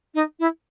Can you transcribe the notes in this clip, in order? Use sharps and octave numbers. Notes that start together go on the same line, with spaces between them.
D#4
E4